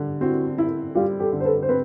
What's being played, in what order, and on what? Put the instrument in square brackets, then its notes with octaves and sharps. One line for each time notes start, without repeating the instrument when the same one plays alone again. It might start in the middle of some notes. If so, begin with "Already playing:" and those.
Already playing: [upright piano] D3 G3
[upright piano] C4 [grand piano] E4 F#4
[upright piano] E4
[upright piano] G3 [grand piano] F4 G4
[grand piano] G4 A4
[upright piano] D3
[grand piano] C5
A4 B4
C5
[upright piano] C4 [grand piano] B4